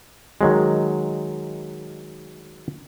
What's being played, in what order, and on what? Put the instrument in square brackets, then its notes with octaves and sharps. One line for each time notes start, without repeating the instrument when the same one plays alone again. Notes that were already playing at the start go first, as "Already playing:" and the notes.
[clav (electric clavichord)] D#3 F#3 G#3